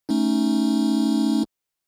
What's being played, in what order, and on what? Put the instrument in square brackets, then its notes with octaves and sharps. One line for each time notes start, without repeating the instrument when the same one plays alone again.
[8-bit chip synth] A3 C#4 D#4